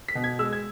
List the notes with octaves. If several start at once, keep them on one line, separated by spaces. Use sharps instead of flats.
B6
B2
G#6
G#3 E6
G#6